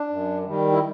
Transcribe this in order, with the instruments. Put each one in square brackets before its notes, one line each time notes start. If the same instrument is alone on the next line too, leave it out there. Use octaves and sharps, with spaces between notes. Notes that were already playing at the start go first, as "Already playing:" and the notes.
Already playing: [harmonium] D4
F#2
D#3 G3
E4